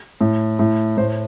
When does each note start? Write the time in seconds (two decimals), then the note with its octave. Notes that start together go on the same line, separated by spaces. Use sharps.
0.21 A2
0.59 A2
0.97 A2 C5